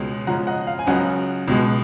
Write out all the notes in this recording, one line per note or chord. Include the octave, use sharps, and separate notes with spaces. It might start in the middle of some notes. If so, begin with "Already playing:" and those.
Already playing: C#2 B2 G#3 C#4
C#3 F3 G#3 C#4 F#5 A#5
D#5 F#5
F5
G#5
C#2 C#3 F#3 C#4 D#5 F#5
C#2 B2 G#3